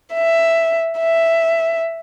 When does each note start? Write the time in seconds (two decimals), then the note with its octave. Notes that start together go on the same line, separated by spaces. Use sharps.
0.14 E5
0.99 E5